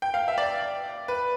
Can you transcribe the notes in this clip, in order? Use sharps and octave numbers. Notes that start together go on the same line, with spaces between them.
G5
F5
E5
D5
B4